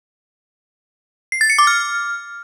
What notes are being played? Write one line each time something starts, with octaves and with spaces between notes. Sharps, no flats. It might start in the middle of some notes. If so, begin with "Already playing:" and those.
C7
A6
C#7
D6
F6